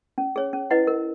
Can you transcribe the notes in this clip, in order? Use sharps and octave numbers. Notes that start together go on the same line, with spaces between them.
C#4
G#4 C#5
C#4
E4 B4 D#5 F#5
A#4